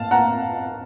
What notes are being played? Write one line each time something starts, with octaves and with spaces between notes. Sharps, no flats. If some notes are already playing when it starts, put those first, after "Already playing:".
Already playing: F5 A5
F#5 A#5